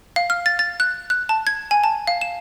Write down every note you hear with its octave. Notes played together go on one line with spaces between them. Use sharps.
F5
F6
A6
A6
F#6
F#6
A5
G#6
G#5
A5
F5
E7